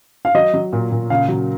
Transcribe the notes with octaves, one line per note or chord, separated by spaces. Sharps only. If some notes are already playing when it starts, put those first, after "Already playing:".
F5
F#3 D#5
F#3
A#2
A#2
C#3 F5
F#3